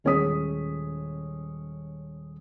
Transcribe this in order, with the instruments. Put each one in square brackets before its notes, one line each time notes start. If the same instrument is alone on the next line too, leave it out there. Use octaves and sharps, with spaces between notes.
[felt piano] D#1 G#3 C#4 C#5 D#6 B6